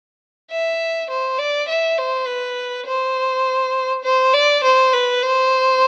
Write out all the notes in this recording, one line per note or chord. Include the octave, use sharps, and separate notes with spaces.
E5
C5
D5
E5
C5
B4
C5
C5
D5
C5
B4
C5